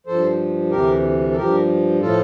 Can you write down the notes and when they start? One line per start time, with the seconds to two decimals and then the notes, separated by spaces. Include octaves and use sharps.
0.07 G2 F3 A4 C5
0.71 D2 C3 E3 G4 A#4
1.31 A4
1.36 G2 F3 G4 A#4
2.01 A2 F3 F4 A4